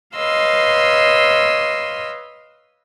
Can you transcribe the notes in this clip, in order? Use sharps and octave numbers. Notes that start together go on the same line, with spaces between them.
B4 C#5 D#5 F5 C6 E6